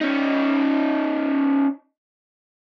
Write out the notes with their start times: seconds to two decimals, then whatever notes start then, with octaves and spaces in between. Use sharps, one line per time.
0.01 C#4 D#4